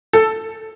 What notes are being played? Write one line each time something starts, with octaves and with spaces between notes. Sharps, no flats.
A4